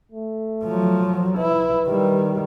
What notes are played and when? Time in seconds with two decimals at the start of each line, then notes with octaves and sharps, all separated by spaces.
0.12 A3
0.64 F3 F#3
1.38 E4 B4
1.86 D#3 G3